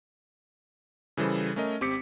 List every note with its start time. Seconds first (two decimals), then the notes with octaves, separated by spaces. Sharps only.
1.17 C#3 E3 G3 A4 C5
1.56 A3 C#4 A#4 D#5
1.81 G#1 C4 G4 D6 B6 C#7